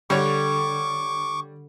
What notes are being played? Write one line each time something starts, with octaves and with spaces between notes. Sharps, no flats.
D3 G3 C#5 C#6 D6